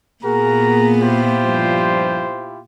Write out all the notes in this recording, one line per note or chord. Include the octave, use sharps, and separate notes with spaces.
A#2 A#3 B3 F#4 G#4 A#4 A#5
E4 F4 G4 C5
G2 F3 G3